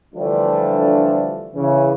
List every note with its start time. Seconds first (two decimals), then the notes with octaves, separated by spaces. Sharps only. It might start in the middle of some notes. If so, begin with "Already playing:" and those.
0.14 D3 E3 F3 G3 A3 D4
1.54 C#3 E3